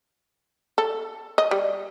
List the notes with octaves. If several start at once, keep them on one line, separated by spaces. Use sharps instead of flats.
A4
D#5
G3